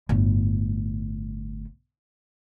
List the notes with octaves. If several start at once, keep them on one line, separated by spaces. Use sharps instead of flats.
G1 A2